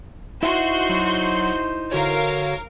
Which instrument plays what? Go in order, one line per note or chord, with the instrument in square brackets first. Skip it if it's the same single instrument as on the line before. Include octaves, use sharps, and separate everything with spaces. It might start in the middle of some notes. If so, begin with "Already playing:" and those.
[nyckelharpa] D#4 C5 [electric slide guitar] E4 E5 [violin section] F#4 C6
[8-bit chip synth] F#3
[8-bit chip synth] D3 F#4 C#5 [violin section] A#4 F5